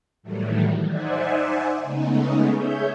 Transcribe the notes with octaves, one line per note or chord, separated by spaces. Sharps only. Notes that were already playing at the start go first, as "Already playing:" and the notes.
A2 D#3 E3 F#3 G3 A3
D#4 C5 D5 E5 F#5 G#5
C#3 G#3 A3 B3 C#4 D#4
G#4 C#5 E5 G6